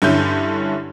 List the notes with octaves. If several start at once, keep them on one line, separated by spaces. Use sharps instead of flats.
G2 D3 C#4 E4 G6